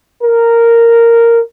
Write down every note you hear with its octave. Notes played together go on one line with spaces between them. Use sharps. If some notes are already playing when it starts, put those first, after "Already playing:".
A#4